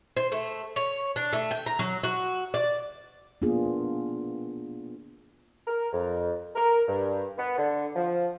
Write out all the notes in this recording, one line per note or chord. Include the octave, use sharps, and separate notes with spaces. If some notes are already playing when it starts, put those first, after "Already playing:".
C5
A3
C#5
D4
A3
G5
A#5
F#3
F#4
D5
A#3 B3 D4 F4 G#4
A#4
F2
A#4
G2
B3
D3
F3